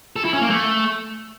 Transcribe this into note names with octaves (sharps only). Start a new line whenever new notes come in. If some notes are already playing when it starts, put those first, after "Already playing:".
A4
E4
C#4
A#3
A3